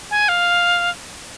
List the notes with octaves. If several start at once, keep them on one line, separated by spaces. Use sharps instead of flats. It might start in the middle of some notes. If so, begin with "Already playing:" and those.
G#5
F5